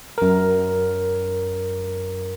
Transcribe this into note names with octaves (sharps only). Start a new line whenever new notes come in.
F#2 A#4